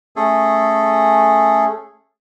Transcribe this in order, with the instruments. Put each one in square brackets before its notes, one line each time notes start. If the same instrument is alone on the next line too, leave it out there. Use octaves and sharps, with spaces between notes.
[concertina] A3 C#4 G#4 A4